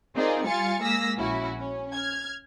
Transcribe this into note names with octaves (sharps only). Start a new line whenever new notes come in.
C4 D#4 F4 G#4 A#4 D5
G3 F4 F5 G#5 A6 C#7
G#3 A#3 G#4 E6 A#6 B6
A#1 C#4 E4 F#4
C#4
F6 G#6